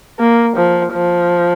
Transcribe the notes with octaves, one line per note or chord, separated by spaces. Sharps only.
A#3
F3
F3